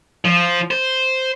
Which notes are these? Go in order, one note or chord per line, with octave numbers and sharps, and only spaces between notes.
F3
C5